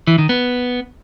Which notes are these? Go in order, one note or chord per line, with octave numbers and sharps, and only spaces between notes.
E3
D#3
B3